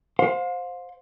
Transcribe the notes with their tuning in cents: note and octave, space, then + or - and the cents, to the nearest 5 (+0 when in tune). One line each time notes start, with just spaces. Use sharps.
C5 +0 F5 +35